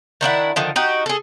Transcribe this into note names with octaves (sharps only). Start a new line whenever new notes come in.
D#3 D4 E4 F#5
D3 D#3 F3
D#4 F#4 G4
G#4 A4